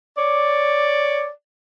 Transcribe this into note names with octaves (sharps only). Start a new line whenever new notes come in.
C#5 D5